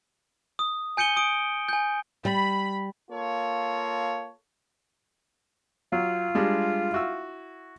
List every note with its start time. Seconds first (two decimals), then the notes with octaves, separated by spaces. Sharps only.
0.59 D#6
0.97 G#5 G6 C#7 D#7 G7
1.17 D#6 D7
1.69 G#5 G6
2.25 G3 B5
3.11 A#3 F4 A4 C#5
5.92 F#3 F4
6.35 G3 G#3 D4
6.92 E4 F#4 E6